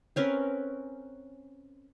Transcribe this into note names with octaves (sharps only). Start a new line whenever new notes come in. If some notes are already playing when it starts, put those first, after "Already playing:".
C4 C#4 A#4 B4